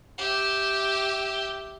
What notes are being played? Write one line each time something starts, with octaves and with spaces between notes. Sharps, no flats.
G4 E5